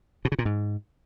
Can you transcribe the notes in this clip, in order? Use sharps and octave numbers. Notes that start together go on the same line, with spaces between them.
B2
C#3
A#2
G#2